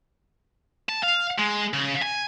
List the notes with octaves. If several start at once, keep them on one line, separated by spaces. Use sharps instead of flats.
A5
F5
G#3
C#3
G#5